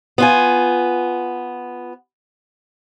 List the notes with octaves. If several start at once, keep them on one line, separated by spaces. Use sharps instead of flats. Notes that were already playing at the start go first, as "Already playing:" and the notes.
B3 F4 G#5